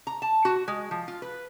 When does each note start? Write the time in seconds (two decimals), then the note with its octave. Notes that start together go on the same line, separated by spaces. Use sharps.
0.07 A#5
0.22 A5
0.45 F#4
0.68 G#3
0.91 F3
1.08 F4
1.22 B4